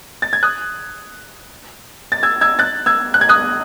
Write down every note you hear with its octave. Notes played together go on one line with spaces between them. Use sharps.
A6
G#6
D#6 F#6
A6
E6 G#6
E6 G#6
F#6 A6
E6 G#6
F#6
G#6
D#6 F#6